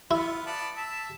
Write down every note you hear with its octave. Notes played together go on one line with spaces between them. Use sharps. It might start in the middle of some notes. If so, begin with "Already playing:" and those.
B3 E4 F4
B3 D5 A5
E5 A5